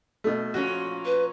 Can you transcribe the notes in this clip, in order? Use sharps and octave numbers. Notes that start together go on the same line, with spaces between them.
B2 A3
A#2 F3 C#4 F#4
B4